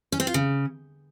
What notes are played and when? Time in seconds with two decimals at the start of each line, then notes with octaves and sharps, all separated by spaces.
0.12 C#4
0.20 C4
0.27 F4
0.34 C#3